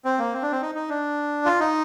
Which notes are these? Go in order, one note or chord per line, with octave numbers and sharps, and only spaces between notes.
C4
A#3
C4
D4
C4
D#4
D#4
D4
F4
D#4